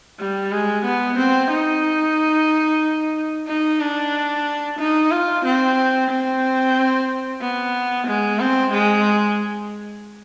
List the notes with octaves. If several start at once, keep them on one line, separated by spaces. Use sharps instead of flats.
G3
G#3
B3
C4
D#4
D#4
D4
D#4
F4
C4
C4
B3
G#3
C4
G#3